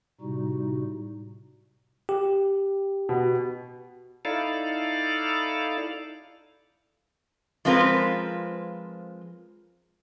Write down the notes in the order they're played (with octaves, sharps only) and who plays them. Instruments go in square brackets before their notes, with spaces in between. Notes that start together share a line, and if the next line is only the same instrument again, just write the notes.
[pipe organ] A2 C3 G3 D#4 F#4
[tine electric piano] G4
[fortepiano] B2
[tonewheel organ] D#4 E4 A4 D5 F5
[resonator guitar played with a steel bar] F3 G#3 C4 F4 A#4 B4